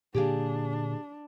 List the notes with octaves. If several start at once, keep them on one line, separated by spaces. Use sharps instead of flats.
A#2 D3 A#3 D4 G4 G#4 F5